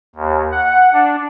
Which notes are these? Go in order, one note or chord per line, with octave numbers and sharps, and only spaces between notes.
D#2
F#5
D4